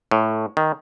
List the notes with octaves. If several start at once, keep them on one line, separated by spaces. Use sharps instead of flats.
A2
D#3